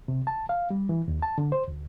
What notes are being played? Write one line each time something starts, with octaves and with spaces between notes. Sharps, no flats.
C3
A5
F5
G3
E3
D#2
A5
D3
C5
D2